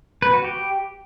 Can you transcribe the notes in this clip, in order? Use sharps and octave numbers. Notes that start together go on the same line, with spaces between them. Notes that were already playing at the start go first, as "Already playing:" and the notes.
B4
F#4
G4